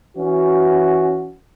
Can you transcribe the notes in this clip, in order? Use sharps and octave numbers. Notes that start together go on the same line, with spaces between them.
E3 C#4 F#4